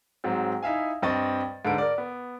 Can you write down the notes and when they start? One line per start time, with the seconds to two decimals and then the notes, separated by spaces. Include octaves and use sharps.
0.24 G#2 F#3 C4
0.63 D#4 E4 E5 F5 G#5
1.02 G2 C4 D#5 C#6 A6
1.65 G#2 D3 A4 B4 D7
1.78 A#4 D5
1.98 B3